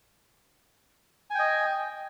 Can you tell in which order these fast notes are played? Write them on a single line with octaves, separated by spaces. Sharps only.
G#5 G5 D#5